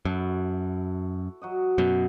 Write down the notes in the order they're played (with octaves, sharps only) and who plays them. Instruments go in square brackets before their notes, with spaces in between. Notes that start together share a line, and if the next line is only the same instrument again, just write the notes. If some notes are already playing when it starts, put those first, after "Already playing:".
[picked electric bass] F#2 [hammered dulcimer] E4 F#4 A4
[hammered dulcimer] F#3 F#4 D#5
[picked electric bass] F#2 B2